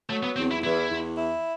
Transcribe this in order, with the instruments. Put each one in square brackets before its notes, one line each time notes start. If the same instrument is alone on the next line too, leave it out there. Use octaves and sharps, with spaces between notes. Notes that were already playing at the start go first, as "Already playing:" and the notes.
[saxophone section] F#3 [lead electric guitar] A3
[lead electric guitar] B3
[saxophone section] E2 [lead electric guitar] C4
[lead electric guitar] E4
[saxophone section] E2 [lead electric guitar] E4
[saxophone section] E2
E4